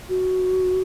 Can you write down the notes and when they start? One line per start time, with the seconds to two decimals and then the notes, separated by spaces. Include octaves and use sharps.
0.09 F#4